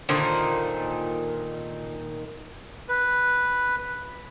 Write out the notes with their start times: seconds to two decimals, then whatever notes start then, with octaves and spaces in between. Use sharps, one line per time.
0.09 A#2 D3 D#3 C5
2.89 B4